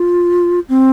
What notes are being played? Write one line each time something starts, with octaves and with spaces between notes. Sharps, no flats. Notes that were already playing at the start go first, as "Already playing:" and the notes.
Already playing: F4
C4